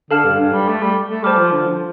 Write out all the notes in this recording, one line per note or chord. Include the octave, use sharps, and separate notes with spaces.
D3 A4 F5 A5 F6
G2
G2
G3
A3
G3
A3
G3 C5 A5 D6 F6
F3
D3
F3